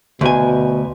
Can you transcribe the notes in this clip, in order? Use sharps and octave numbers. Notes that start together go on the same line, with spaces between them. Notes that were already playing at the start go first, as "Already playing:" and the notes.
D2 B2 G#5